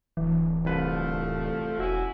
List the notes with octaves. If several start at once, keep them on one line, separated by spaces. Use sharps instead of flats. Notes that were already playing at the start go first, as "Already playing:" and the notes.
D1 E3
C2 F3 A3 B4
E1 C#4 E4 F#4